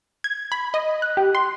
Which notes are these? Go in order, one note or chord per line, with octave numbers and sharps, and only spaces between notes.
G#6
B5
D#5
F#6
G4
C6